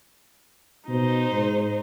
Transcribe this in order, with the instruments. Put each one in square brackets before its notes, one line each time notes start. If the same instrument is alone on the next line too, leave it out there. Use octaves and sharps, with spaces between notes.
[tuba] B2 [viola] D#4 C5
[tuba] G#2